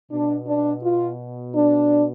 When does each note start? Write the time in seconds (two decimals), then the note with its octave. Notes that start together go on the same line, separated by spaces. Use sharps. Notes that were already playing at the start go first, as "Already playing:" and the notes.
0.11 B2 D4
0.46 D4
0.82 F4
1.54 D4